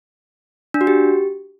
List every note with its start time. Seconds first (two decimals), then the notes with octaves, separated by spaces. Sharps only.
0.74 D4
0.81 F#4
0.87 G4